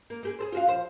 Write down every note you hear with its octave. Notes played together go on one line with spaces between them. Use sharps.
A#3
A#3 G4 G#4
G#4 A4 C5
F4 F#4 F5
A#2 F3 C5